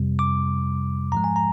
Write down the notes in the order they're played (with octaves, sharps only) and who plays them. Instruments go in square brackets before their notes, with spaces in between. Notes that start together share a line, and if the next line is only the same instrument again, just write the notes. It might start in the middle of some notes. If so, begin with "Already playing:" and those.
Already playing: [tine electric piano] F2 C3 G3
D6
G#2 F3 G#3 A#5
G#5
A#5